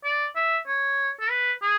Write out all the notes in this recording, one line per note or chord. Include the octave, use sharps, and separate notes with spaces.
D5
E5
C#5
A4
B4
G#4